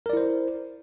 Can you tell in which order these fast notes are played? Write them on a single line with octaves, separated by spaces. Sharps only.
A#4 D5 E4 C5